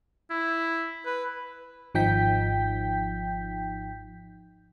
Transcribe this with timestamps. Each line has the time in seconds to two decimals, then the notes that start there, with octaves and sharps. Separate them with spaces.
0.30 E4
1.05 B4
1.95 G#1 F3 D#4 G5 G6 B6